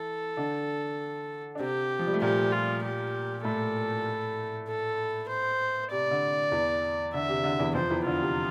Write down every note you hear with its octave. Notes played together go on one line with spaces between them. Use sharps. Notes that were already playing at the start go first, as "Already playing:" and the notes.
Already playing: E3 E4 A4
D3 D4
D4
C3 C4 G4
F3
G3
A3
A#2 A#3 G4
F4
G4
A2 A3 A4
A4
C5
C3 D5
D3
E2 E3
D3 E5
C3
D3
E2 E3
F2 F3 C5
E2 E3
D3 F4
C3